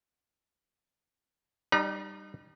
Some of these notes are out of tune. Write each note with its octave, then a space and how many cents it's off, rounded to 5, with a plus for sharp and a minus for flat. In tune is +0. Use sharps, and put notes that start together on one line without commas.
G3 +0 D#4 -35 A#5 +45